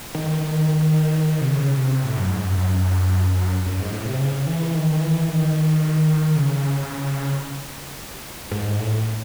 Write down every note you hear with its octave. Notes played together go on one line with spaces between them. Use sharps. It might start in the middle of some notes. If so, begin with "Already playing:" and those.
D#3
D#3
D#3
C3
C#3
C3
A2
F#2
G#2
F#2
F#2
F#2
G#2
A2
C3
C#3
E3
D#3
E3
D#3
D#3
C#3
G#2
A2